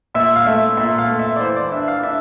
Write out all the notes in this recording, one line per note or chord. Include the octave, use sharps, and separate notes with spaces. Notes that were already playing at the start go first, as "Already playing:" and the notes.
A#2 E5
F5
A3 E5
A#2 E5
F5
A3
E5
D5
E3 C5
D5
D4 E5
F5
D4 E5